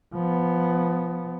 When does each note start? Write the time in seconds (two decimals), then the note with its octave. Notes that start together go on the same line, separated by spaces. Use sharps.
0.15 F3 B3